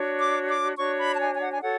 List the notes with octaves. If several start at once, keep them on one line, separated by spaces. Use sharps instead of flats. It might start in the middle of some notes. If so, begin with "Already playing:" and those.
Already playing: D4 F#4 C#5
D6
D6
D4 F#4 C#5 C#6
B5
A5
G#5
G#5
F#5
G#5
F#4 A4 C#5 F#5